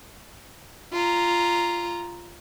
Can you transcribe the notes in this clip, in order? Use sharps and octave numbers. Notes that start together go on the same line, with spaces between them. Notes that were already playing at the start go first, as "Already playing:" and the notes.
F4 A#5